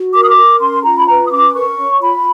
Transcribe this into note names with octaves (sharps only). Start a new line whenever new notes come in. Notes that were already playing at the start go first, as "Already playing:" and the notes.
Already playing: F#4
A#4 D6
D#6
D6
A#4
C#4 C6
F4 A#5
B5
B4 A#5
D#6
C#4 D6
A#4 C#6
C#5
F4 B5